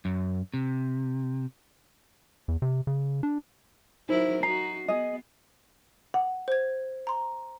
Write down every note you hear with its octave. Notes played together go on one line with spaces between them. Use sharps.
F#2
C3
E2
C3
C#3
D4
F#3 D#4 E4 A#4 C5
D#4 F#4 A#5 C7
B3 G#4 D#5
F#5
C5 G#6
A#5 C6